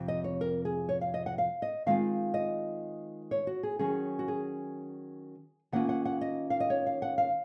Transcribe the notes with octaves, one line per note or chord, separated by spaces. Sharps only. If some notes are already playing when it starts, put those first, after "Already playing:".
Already playing: F2 C3
D#5
C#5
A#4
G#4
C#5
F5
D#5
F#5
F5
D#5
D#3 G#3 C4 F4 F5
D#5
C#5
F#4
G#4
D#3 F#3 C#4 G#4
F#4
G#4
D#3 A#3 C#4 F4 F#5
F#5
F#5
D#5
F5
D#5
C#5
F5
F#5
F5